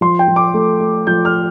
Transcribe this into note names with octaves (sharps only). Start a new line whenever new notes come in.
F3 C6
G5
F3
D6
A3
A3
F3 G6
F6